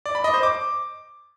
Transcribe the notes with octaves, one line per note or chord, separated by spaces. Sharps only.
D5
B5
D#5
C5
D6